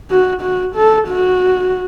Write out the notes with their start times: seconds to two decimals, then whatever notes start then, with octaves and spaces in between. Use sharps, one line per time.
0.11 F#4
0.42 F#4
0.76 A4
1.08 F#4